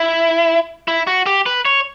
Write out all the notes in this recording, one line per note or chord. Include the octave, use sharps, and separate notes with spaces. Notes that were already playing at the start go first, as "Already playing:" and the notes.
Already playing: E4
E4
F#4
G4
B4
C#5